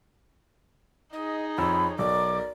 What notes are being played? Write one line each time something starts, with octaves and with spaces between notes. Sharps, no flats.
D#4 G#4 D#5
F2 C#5 B5 E6
B1 A#4 D5 D6